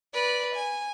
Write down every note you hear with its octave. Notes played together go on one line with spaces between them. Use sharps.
B4 D5
G#5